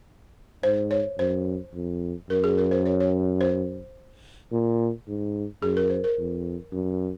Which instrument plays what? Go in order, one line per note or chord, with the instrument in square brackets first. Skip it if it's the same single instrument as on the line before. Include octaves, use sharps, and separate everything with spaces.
[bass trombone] G#2 [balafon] C5
[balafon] C#5
[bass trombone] F#2 [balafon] C5
[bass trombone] F2
[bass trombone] F#2 [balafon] A#4
[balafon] G#4
A#4
C5
C#5
C#5
C5
[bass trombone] A#2
G#2
[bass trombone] F#2 [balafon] G#4
[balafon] A#4
C5
A#4
[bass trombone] F2
F#2